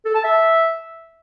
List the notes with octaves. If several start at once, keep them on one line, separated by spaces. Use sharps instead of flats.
A4
A5
E5